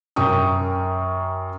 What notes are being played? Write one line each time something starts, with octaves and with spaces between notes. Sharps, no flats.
F#2 A#4 G5 C#6 D#6